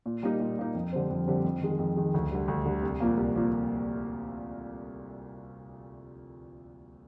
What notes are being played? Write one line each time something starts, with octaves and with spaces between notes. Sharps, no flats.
A#2
G3 A#3 D#4
A#2
G3 A#3 D#4
F2
D3 G3 C4
F2
D3 G3 C4
F2
D#3 G#3
F2
D#3 G#3
D2
D3 G3
D2
D3 G3
C2
A#2 F3 A#3
C2
A#2 F3 A#3